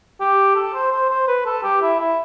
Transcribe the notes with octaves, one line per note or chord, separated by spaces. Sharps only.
G4
A4
C5
C5
C5
B4
A4
G4
E4
E4